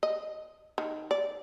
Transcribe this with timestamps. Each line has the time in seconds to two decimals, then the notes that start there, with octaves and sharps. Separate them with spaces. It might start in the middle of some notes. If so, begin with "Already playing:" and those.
0.03 D#5
0.78 D#3
1.11 D5